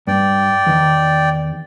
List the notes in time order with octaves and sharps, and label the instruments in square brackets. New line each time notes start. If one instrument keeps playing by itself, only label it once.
[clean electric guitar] G2 [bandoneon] D5 G5
[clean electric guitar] E2 D#3